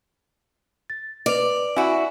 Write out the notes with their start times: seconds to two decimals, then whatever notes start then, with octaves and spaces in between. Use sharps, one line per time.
0.90 A6
1.26 B4 D5 F7
1.76 E4 F#4 G#5 B5